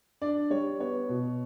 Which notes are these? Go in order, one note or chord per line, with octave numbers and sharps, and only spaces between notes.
D4 D5
G3 C#5
B3 C#5
B2